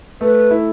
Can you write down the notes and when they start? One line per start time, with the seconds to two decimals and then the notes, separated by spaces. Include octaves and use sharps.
0.21 A3 B4
0.51 E4